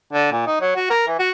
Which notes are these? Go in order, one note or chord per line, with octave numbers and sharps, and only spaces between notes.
D3
A#2
D#4
F#3
F#4
A#4
E3
F#4